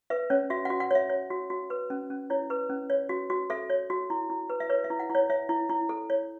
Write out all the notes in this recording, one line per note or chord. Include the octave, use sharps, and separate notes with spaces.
B4 E5
C#4 C#5
F#4 E5
F#4 F#5
F#5
C#5 E5
C#5
F#4
F#4
B4
C#4
C#4
E4 C#5
B4
C#4
C#5
F#4
F#4
A4 E5
C#5
F#4
E4
E4
B4
E5
B4 C#5
E5
E4
F#5
E4
C#5
C#5 E5
E4
E4
A4
C#5